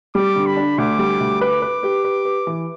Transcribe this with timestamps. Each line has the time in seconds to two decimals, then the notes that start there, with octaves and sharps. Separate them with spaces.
0.15 G3 D6
0.36 D3
0.46 B5
0.57 D4
0.78 D2 D6
0.99 G3
1.20 D2
1.41 B4 D6
1.62 B4
1.83 G4
2.04 B4
2.25 B4
2.47 E3